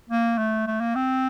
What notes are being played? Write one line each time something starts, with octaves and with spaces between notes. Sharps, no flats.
A#3
A3
A3
A#3
C4